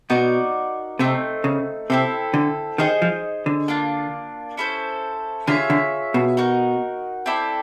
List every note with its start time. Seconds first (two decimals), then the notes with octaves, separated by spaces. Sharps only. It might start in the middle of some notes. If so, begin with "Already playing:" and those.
0.10 B2 D#4 F#4 A#4 D5
0.99 C3 A3 C4 D#4
1.44 C#3
1.90 C3 C4 E4 A4
2.34 D3
2.78 D#3 D#4 G#4 C5 D#5
3.02 F3
3.46 D3
3.68 A#3 D4 F4
4.57 C#4 E4 A4 C5
5.47 D3 F4 G#4 C#5 E5
5.70 D3
6.14 B2
6.37 D#4 F#4 A#4
7.26 C4 E4 A4 D5